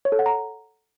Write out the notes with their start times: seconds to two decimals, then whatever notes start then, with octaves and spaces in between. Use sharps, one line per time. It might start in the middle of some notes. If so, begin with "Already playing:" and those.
0.05 C#5
0.12 A4
0.19 F#5
0.26 A#5